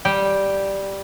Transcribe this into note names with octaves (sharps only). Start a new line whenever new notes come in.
G3 G5